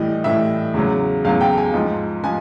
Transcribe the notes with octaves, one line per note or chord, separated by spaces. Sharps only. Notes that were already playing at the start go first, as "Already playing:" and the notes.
Already playing: A2 E3 G3 D#5
A2 E3 G3 E5
E2 C#3 F#3
E2 C#3 F#3 F5
G5
G#5
G#2 F3
F3 G#5